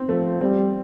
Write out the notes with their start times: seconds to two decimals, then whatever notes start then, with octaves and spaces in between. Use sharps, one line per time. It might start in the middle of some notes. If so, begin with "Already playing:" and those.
Already playing: C4
0.09 F3 A3
0.41 G3 C4